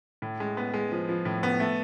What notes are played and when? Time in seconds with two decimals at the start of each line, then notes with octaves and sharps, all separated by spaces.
0.22 A2
0.40 G#3
0.57 B3
0.74 G#3
0.92 F3
1.09 F3
1.25 A2
1.43 B3
1.60 A3